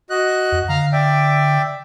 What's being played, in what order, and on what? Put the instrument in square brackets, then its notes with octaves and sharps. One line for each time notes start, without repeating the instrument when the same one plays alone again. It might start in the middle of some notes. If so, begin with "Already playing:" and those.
[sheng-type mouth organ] F#4 D#5 F#6
[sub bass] F2
[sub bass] D3 [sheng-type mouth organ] F5 A#5
[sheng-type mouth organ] D5 E5 G5